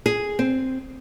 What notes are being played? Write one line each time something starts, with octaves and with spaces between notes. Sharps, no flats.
G#4
C4